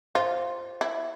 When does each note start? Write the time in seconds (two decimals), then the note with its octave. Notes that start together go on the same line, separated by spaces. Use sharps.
0.15 F4 C5
0.81 E4